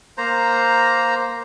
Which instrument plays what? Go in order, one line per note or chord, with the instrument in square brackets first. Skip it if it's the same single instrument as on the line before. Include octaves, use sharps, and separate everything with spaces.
[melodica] A#3 C5 A#5